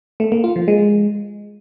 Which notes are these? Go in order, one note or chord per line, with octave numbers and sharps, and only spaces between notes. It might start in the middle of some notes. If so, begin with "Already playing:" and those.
A3
A#3
F4
F3
G#3